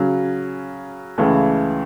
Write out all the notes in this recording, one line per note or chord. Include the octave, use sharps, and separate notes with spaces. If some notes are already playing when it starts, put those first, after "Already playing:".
Already playing: C#3 F#3 C#4
C#2 C#3 E3 A3